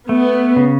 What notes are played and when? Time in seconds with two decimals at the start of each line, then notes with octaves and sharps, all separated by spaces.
0.09 A3 B3
0.56 C#3